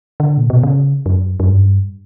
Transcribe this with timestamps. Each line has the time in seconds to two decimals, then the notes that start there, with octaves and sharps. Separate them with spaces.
0.20 D3
0.37 A#2
0.50 B2
0.63 C#3
1.06 F#2
1.40 F#2
1.49 G2